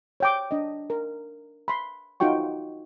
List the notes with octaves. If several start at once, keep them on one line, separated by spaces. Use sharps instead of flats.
C#5 G5 D6
D4 D#5
A#4
B5 C6
D#4 F4 F#4 G5 C#6